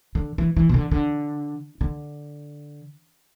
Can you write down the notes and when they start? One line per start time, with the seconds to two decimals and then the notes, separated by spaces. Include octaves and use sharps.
0.15 D3
0.38 E3
0.56 E3
0.69 B2
0.74 D3
0.91 D3
1.81 D3